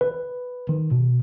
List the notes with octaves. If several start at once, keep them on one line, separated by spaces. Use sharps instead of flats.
B4
D#3
B2